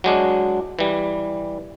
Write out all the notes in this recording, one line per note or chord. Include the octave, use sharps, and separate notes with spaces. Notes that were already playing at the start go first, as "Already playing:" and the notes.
F#3 G#3 D4
E3 G3